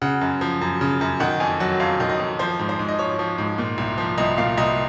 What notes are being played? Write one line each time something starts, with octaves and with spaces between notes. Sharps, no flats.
C#3 F#5
F#2
F3
F#2
C#3
F#2
D#3 F#5
F2 G#5
F#3 F#5
F2 F5
D#3
D#5
F2
F3 C5
G#2
C5
G#2
D#5
F3 C#5
F3
G#2
A#2
C2
F3
C2 D#5
A#2 F5
C2 D#5